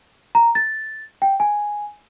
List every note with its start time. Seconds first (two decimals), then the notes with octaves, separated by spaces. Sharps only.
0.35 A#5
0.55 A6
1.22 G5
1.40 G#5